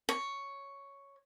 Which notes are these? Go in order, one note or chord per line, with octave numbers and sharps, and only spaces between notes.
C#5